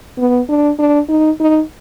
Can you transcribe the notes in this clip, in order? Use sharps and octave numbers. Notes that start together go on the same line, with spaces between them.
B3
D4
D4
D#4
D#4